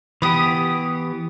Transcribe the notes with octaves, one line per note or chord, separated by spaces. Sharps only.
E3 B3 G4 B4 D#6